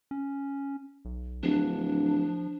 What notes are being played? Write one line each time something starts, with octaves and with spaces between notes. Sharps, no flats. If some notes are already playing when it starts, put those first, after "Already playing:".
C#4
B1
D1 F3 D4